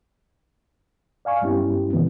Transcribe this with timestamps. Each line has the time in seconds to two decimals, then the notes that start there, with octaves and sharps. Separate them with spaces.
1.25 D5 F5 G#5 C#6
1.42 G2 G3 B3 C#4 E4 G4
1.93 A2 C3 E3 B3